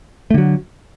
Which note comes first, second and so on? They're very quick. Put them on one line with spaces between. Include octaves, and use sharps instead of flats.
A3 D3 F#3